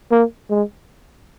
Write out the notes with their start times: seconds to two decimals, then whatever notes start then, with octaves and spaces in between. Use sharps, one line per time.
0.12 A#3
0.50 G#3